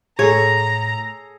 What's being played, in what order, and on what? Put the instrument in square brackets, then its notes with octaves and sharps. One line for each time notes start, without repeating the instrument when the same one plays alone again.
[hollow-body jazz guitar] A2 [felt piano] G#4 A4 [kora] C#5 [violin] A#5